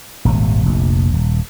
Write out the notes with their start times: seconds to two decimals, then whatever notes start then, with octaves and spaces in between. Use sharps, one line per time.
0.25 D#1 G#1 C3
0.65 F1 A#1
1.14 D#1